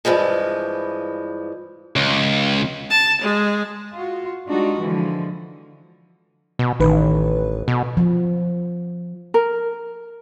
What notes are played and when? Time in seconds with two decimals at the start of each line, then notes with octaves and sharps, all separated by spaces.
0.05 G2 E3 F3 G#3
1.96 C#2
2.90 A5
3.21 G#3
3.94 F4 F#4
4.46 G3 G#3 D4 D#4 F4 F#4
4.80 D3 E3 F3 G#3
6.59 B2
6.80 A1 D#3 B4
7.68 B2
7.97 F3
9.34 A#4